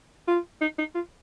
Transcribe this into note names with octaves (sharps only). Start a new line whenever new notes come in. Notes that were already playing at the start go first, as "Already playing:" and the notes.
F4
D#4
D#4
F4